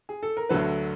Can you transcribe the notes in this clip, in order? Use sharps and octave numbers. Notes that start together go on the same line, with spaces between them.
G#4
A4
A#4
D2 D3 F#3 A4 B4